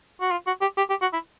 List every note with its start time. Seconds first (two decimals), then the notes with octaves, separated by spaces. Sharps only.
0.21 F#4
0.31 F4
0.47 F#4
0.61 G4
0.77 G4
0.90 G4
1.01 F#4
1.13 E4